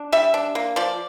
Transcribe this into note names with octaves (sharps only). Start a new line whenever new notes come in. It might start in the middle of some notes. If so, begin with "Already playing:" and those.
Already playing: D4
G3 E5
D4
A#3
F3 D5